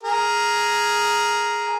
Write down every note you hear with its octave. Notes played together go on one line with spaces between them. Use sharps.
G#4 A#4